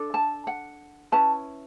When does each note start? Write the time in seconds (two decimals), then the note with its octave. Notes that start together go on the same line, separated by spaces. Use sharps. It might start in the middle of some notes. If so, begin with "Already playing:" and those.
Already playing: D4 A4
0.14 A5
0.47 F#5
1.12 C#4 E4 B4 A5